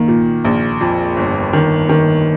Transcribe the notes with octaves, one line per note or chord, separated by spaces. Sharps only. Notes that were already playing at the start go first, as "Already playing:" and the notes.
Already playing: D#3 A#3
A#2
A#1
F2
G1
D#3
D#3